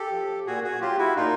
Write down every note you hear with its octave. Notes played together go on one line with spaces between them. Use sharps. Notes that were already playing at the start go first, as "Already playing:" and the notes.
Already playing: G4 A4
F3
A#2 F#4 G#4
F#4 G#4
F#3 F4 G4
E4 F#4
A#2 D#4 F4